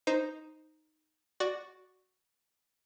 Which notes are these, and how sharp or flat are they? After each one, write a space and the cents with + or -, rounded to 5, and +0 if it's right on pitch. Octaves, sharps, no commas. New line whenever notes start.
D#4 +0 C5 +0
F#4 +0 D5 +0